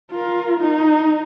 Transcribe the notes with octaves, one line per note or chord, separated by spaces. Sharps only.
F4 A#4
D#4